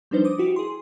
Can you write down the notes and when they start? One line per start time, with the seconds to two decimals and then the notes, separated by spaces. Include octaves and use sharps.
0.11 F3 G3 D4 D#4 B4 C5
0.24 D6 D#6
0.38 E4 F#4 G4
0.56 G#4 C6